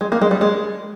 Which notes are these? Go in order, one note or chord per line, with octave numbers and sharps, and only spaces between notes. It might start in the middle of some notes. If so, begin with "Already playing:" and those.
G#3
A#3
G#3
G3
G#3